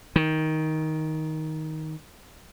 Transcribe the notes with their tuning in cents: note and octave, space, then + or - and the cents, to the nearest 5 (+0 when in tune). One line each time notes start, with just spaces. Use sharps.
D#3 +10